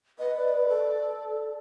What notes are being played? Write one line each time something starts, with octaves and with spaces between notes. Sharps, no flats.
B4 D#5
D5
A4